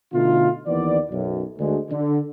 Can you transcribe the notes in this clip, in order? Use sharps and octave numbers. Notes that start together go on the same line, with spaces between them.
B2 D3 A3 D#4 F4
D#2 E3 B3 D5
B1 F#2
D2 G#3
D3